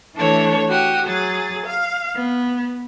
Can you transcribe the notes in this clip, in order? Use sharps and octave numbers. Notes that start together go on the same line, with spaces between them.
E3 A3 D4 C#5
F#4 G4 D#6
F#3 G#4 A6
F5
B3